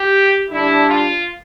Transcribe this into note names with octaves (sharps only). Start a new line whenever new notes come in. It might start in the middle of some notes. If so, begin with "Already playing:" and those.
Already playing: G4
D3 G3 D4 E4
F4